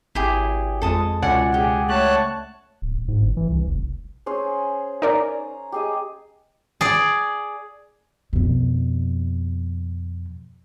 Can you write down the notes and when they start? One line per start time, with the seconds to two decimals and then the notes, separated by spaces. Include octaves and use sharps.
0.15 G#1 E4 G4 G#4
0.82 F2 G#3 A4 A5 D#6
1.22 C#2 B2 D5 F#5 G#5
1.54 G4 G#4
1.89 A3 C#5 A5 F#6
2.82 D1
2.96 D#1
3.08 G#2
3.21 G1
3.37 E3
3.50 C2
3.68 F1
4.26 C#4 G#4 C5
5.02 D#4 A#4 D5 A#5
5.72 G4 G#4 D#5
6.81 G#4 D5
8.33 F2 B2